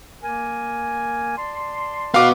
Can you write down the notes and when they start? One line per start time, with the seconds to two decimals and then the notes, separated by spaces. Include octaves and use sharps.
0.22 A#3 A#4 G#5
1.36 D5 A5 C6
2.14 B3 F#4 F5 D6